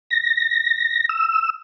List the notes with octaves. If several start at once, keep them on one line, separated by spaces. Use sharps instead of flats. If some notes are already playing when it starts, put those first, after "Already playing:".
A#6
E6